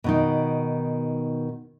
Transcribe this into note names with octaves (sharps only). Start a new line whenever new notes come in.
B2 D#3 D#4